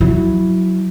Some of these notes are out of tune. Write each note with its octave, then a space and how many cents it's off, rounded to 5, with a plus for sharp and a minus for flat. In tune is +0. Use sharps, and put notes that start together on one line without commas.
F#3 +0 E4 -5